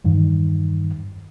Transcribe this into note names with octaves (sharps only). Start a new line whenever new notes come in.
E2 G2 D#3